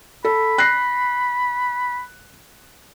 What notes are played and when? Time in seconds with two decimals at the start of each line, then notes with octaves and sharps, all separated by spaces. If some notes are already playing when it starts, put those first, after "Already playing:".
0.25 A4 B5
0.58 F#6 A#6 C7